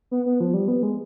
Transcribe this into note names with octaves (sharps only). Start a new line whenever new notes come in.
B3
B3
F3
G3
B3
G#3